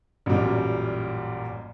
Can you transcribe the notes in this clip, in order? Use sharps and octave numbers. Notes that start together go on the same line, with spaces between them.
A1 F#2 A#2 G3